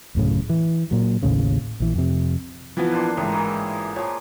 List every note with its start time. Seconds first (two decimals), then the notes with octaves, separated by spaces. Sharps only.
0.15 D1 F#2 A2 C#3
0.49 E3
0.91 A#2 F#3
1.23 A1 D#2 A2 C#3
1.80 A#1 E3
1.95 F2 C3
2.77 E3 F3 B3
2.91 A#2 D4 C6
3.17 A1 G#2 D#3
3.32 E3 A#3 G#4
3.96 A#2 F3 C#5